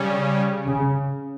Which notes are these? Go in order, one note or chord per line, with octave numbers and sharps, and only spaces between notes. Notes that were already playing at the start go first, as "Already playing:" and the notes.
Already playing: C#3 G3 C#4
C#3